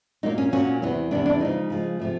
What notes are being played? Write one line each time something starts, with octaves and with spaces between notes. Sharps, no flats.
A#2 F#3 A#3 D#4
C#4
A#2 F#3 A#3 C#4
E2 C3 E3
E2 C3 E3 D4
D4
C#3 F3 G#3 D#4
C#3 F3 G#3
C3 F3 A3